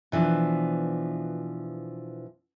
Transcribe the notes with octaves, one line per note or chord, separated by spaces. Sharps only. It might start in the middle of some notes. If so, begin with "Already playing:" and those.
B2 E3 F3 D4